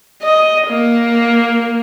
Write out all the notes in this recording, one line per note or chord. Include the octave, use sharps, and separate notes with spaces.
D#5
A#3